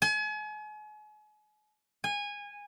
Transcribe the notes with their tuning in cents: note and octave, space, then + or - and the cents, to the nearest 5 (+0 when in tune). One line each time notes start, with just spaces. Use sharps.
G#5 +40
G#5 -20